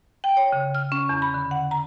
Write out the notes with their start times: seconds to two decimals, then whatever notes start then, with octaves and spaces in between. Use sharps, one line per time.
0.24 G5
0.37 C#5
0.52 C#3
0.75 F6
0.92 C#4
1.09 E2
1.22 B5
1.34 D3
1.51 F#5
1.71 A#5